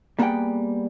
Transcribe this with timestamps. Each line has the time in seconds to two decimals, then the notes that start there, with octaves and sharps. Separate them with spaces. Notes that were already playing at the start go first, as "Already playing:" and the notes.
0.19 G3 A#3 B3 G#4 F#5 G5